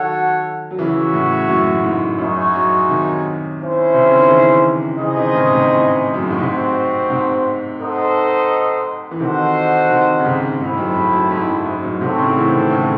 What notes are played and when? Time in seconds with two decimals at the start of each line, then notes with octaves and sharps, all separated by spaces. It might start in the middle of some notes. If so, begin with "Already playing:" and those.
Already playing: D#3 F#3 F#4 A4 C#5 F#5
0.71 F#3
0.78 C#3 E3 F#4 C#5 E5
1.13 A2 C#3
1.48 F#2 A2
1.75 A2
1.83 G#2
2.18 F#2 G#3 D#4 F#4 C#5 E5
2.54 F#2
2.89 C3 D#3
3.58 C#4 E4 C5 E5
3.94 C3
4.06 C#3
4.17 D#3
4.28 C#3 E3
4.98 C#3 E3 D#4 G#4 C5 D#5
5.16 C3 D#3
5.34 A2 C#3
5.51 G#2 C3
5.69 A2 C#3
6.14 F#2
6.22 G#2
6.30 A2
6.39 G#2 C3 C4 F#4 C5
7.10 G#2 C3
7.79 D#4 A4 C5 D#5 F#5
9.11 E3
9.19 C3 D#3 F#4 A4 C5 D#5 F#5
9.90 C3 D#3
10.19 C#3
10.25 G#2 C3
10.61 G#2 A3 C4 E4
10.73 G#2
10.77 F#2
10.95 G#2
11.12 F#2
11.31 G#2
11.48 F#2
11.65 G#2
11.83 F#2 A2
12.01 G#2 C3 C4 F#4 A4 C#5
12.17 A2 C#3
12.35 C#3 E3
12.53 C3 D#3
12.70 A2 C#3